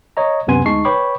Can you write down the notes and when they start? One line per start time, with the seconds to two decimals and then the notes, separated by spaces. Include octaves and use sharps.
0.17 C#5 D#5 A#5
0.47 C#2 F#2 C3 B3 G#5 C6
0.65 D2 G#3 D#4 A5 C#6 C7
0.85 B4 C#5 G5 B5 C#6 D6